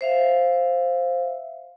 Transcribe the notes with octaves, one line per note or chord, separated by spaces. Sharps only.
C5 E5 F5